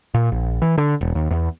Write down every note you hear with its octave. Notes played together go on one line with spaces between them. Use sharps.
A#2
A#1
E3
D3
E1
D#2
E2